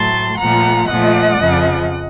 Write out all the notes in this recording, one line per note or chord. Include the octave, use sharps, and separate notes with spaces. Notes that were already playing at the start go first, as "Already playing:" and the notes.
Already playing: A2 F#3 A3 A5 C6
A#2 F3 A3 F#5 A#5
A#2 F3 A3 D#5 F#5
F2 C#3 F3